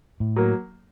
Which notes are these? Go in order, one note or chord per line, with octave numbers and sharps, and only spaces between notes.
A2
F#3 A#3